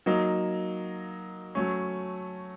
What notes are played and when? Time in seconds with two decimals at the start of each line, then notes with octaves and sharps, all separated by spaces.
0.06 F#3 A#3 D#4
1.55 F#3 A3 C#4